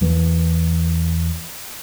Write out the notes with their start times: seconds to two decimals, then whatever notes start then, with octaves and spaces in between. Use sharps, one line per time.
0.01 E2 E3 A#3